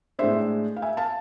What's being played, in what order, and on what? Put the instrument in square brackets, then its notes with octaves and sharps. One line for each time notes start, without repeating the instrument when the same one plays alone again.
[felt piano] A2 G#3 D4 C5 E5
F5
E5 G#5
F5 A5